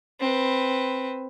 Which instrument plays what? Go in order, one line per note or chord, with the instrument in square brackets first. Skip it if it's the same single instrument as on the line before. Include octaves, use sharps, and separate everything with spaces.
[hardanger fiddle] C4 B4